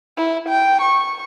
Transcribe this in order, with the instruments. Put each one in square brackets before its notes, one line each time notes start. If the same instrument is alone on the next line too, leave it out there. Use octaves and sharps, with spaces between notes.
[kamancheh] E4
G5
C#6